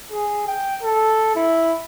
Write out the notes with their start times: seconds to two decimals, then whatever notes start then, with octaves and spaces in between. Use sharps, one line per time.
0.12 G#4
0.48 G5
0.82 A4
1.36 E4